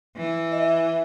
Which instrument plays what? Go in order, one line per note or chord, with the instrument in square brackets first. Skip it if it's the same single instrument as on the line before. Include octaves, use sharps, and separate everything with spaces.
[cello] E3
[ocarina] D#5
E5